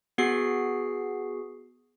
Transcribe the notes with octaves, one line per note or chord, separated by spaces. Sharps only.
B3 F#4 G#4 C7